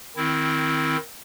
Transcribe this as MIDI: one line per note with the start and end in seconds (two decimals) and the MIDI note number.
0.16 0.97 51
0.16 0.97 60
0.16 0.97 64